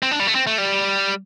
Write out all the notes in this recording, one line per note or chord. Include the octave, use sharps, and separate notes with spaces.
C4
D4
G3
A3
C4
A3
G3